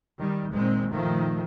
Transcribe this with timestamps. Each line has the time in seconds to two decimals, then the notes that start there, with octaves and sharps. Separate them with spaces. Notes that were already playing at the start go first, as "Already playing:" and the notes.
0.18 D#3 G3
0.50 F#1 A#2 D#3 G#3 C4
0.90 A#2 D#3 F3 A3